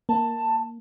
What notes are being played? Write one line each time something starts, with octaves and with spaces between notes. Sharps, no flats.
A#3 A5